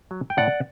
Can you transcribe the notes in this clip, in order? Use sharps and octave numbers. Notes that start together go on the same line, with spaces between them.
F#3
G5
A2 D5 F#5